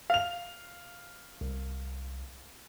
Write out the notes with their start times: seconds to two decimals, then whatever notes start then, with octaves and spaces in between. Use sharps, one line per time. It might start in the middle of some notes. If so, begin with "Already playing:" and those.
0.10 F5 F7
1.41 C2